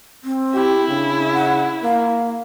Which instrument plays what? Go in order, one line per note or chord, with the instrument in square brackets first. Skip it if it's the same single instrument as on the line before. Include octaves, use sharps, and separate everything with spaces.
[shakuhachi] C4
[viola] E4 [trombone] G4
[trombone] C#3 [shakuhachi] D4
[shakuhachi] F#5
[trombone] A#3 [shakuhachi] F5